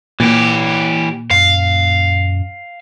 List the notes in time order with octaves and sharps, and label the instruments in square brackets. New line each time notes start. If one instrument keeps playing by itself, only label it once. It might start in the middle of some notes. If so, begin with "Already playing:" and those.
[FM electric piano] A#2 [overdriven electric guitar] E3 G4
[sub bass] F#2 [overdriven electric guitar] F5